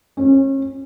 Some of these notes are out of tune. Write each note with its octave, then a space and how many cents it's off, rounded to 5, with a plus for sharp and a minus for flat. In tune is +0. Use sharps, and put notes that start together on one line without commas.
C#4 -35